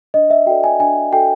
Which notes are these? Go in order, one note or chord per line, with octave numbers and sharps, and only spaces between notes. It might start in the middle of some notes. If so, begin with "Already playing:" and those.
D4 D#5
E5
F#4 A4 D5 G5
G#5
D4 G#5
F#4 A4 D5 G5